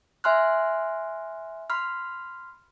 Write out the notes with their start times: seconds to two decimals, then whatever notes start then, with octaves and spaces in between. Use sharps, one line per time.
0.24 E5 G#5 C6 F6 F#6
1.70 B5 C6 F6